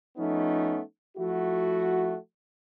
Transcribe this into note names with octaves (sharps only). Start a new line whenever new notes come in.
F3 A3 B3 C#4 D#4
F3 A3 E4 F#4